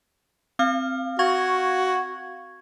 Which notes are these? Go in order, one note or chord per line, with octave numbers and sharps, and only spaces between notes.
C4 F5 F6
F#4 F5 C#6 G#6